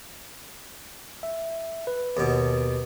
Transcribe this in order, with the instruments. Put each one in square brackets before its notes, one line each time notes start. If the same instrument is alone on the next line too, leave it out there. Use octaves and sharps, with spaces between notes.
[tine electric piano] E5
B4
[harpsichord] D#2 B2